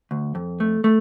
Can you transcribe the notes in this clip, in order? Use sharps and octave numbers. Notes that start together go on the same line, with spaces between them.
D2
F2
A3
A3